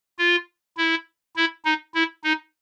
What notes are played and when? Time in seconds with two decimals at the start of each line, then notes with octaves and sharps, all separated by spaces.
0.19 F4
0.77 E4
1.36 E4
1.65 D#4
1.94 E4
2.24 D#4